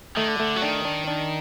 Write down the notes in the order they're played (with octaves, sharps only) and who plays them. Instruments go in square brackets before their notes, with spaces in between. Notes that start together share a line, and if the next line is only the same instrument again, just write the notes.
[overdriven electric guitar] D#3 [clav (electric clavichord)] A3
[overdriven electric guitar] D3
[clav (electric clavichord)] A3
[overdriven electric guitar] F#3
[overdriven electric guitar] D#3 [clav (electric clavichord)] D4
[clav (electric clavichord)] D4
D4